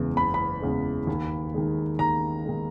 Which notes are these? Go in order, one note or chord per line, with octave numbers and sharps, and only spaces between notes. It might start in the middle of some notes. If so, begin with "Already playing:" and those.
Already playing: F#1 E2 C#3 E3 G#3
F#1 B5
B5
E2 C#3 E3 G#3
D#2
D#3 G#3
D#2 A#5
D#3 G#3